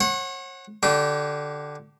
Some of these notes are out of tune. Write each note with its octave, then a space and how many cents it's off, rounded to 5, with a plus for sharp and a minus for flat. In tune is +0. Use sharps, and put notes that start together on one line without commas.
C#5 -40 F#5 +0
D3 +0 G4 -35